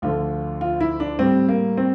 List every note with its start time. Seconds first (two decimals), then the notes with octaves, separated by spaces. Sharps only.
0.02 D2 D3 F3 F4
0.61 F4
0.81 E4
1.00 D4
1.19 A2 G3 C4
1.49 A#3
1.77 C4